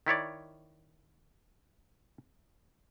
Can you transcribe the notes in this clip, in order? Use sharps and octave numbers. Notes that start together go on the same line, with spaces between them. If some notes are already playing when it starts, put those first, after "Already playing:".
D#3 E4 C#5 D5